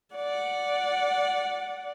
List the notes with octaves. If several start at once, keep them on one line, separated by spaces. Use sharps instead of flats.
D5 F#5